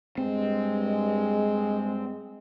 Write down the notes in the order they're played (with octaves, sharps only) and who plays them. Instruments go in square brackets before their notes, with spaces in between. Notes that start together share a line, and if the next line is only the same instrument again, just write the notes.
[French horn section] G2 G#3 [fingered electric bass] C4